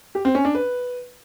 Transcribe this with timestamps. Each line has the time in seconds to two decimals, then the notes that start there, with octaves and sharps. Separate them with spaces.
0.15 G4
0.25 C4
0.35 C#4
0.45 D4
0.55 B4